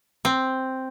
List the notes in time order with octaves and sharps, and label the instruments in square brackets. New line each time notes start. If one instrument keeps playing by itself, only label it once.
[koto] C4